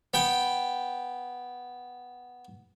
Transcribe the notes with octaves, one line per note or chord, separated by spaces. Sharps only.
B3 G5